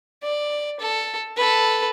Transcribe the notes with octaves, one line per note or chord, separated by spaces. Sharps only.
D5
A4
A4 B4